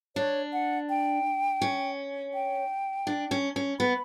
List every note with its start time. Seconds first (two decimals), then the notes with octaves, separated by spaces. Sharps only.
0.16 D4 C#5
0.53 F#5
0.89 G5
1.61 C#4
2.34 G5
3.07 D4
3.31 C#4
3.56 C#4
3.79 B3 B5